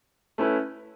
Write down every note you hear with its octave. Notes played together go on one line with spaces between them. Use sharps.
A3 C#4 E4 B4